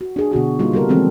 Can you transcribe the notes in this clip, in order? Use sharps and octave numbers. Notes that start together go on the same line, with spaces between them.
F#4
D4 G#4
B2 D3 F#4 G#4
G3 A#3 B3 D#4 F4
C#3 G3 A4 A#4
E3 F3 G#3 C4 G4 A4